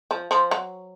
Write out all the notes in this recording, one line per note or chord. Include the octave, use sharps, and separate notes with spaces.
F3
F3
F#3